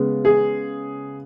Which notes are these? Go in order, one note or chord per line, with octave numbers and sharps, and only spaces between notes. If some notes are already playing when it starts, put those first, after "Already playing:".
Already playing: C#3 G#3 B3
G#4